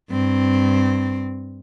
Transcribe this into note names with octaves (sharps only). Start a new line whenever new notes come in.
G2 C4